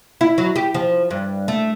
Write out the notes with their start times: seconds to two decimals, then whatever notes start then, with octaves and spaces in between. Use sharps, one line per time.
0.21 E4
0.38 F#3
0.56 G4
0.74 F3
1.11 G2
1.48 A3